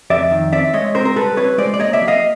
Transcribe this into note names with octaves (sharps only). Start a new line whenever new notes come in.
F2 D5 E5
D#3
C4 D5 E5
G#3 C#5 D#5
C4 A#4 C5
A#4
G3 A4 B4
C4 B4 C#5
G#3 C5 D5
D5
A#3 C#5 D#5
D5 E5
F#3
D#5 F5